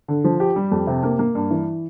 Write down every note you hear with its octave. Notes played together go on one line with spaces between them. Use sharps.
D3
F3
G4
G3
F2
C3
A#3
A#3
G2
E3